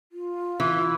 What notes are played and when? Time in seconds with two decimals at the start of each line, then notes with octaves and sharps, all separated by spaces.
0.12 F4
0.60 E3